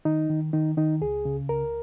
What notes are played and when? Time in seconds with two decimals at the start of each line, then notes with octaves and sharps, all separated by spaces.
0.05 D#3 D#4
0.30 D#3
0.53 D#3 D#4
0.77 D#3 D#4
1.02 C#2 G#4
1.25 C#3
1.49 C#2 A#4